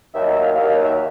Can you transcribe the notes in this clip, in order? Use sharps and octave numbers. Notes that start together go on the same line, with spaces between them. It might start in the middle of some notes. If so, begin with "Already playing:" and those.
D#2 D#3 F#3 E5
E5
F5
D#2 D#3 F#3 F5
F5
E5